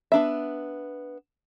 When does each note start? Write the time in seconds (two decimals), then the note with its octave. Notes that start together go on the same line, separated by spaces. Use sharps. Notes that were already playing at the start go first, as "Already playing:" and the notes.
0.12 B3 D4 E5